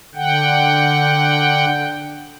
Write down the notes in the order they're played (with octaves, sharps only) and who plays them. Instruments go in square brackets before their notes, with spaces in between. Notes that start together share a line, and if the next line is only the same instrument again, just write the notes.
[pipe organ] D3 F#5 G5